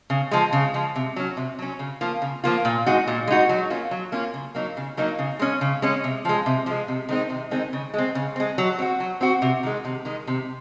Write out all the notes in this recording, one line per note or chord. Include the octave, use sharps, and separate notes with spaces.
C#3
F3 G#3
C#3
F3 G#3
C3
F#3 C#4
C3
F#3 C#4
C#3
F3 A#3 F4
C#3
F3 A#3 F4
A#2
G#3 D#4 F#4
A#2
G#3 D#4 F#4
F#3
A#3 C#4 F4
F#3
A#3 C#4 F4
C#3
F#3 A#3 D#4
C#3
F#3 A#3 D#4
C#3
G#3 C#4
C#3
G#3 C#4
C3
F3 G#3
C3
F3 G#3
C3
D#3 G#3 C4 D#4
C3
D#3 G#3 C4 D#4
C#3
G#3 C4
C#3
G#3 C4
F#3
C4 F#4
F#3
C4 F#4
C3
D#3 G#3
C3
D#3 G#3
C3